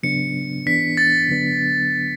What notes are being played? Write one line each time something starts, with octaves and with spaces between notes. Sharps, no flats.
C#3 F#3 B3 D4 C#7
E3 B3 D4 B6
A6
D3 F#3 B3 D4